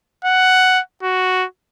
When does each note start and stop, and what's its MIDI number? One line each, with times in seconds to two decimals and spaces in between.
0.25 0.81 78
1.03 1.45 66